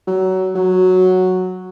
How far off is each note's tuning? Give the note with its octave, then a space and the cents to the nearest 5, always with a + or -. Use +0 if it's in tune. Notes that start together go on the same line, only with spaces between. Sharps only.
F#3 +20
F#3 -5